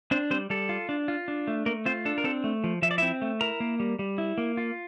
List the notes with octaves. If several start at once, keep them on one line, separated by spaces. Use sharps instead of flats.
C4 D4 C5
G3 C4 C5
G3 A4
F4
D4
F4
D4
A3
A3 A#3 A#4
C4 F4 C5
D4 A4
A#4
C4 A4
A3
F3
F3 E5
D5
C4 E4 E5
A3
E4 A#4 A#5
A#3
G3
G3
E4
A#3
F4